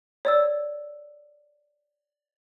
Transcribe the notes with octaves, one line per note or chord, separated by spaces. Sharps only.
C#5 D5 E6